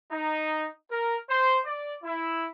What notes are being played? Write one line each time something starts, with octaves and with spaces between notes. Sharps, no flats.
D#4
A#4
C5
D5
E4